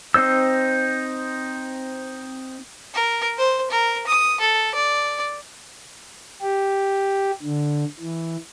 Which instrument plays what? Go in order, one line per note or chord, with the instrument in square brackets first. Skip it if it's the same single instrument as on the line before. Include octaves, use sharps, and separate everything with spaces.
[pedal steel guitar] C4 D#4 C5 E6
[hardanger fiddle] A#4
C5
A#4
D#6
A4
D5
[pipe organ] G4
D3
E3